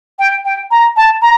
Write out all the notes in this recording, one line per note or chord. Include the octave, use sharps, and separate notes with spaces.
G5
G5
A#5
A5
A#5